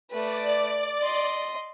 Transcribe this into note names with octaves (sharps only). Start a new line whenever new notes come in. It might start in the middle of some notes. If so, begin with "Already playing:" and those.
A3 B4 D5
D#5 C6